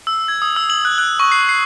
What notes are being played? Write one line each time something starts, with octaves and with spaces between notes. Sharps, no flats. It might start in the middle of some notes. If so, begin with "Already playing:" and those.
E6
G#6
D#6
E6
F#7
F#6
F#6
C#6
C7
C7